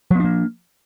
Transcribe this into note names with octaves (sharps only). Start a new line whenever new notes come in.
F3 A#3 B3 D4